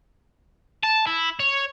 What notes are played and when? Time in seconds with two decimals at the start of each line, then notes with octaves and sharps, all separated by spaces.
0.83 A5
1.07 E4
1.40 C#5